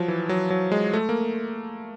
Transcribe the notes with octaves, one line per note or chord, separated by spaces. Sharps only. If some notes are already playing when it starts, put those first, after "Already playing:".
Already playing: F3 F#3
E3
F#3
F#3
G#3
A3
A#3